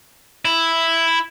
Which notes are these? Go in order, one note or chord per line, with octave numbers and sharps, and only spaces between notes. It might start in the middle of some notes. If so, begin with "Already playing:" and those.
E4